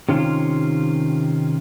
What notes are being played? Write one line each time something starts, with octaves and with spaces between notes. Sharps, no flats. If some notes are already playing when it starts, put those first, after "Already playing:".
C3 D#3 C#4 F4